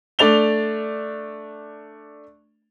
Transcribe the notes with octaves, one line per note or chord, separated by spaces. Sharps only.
A3 D4 D5 F7 G7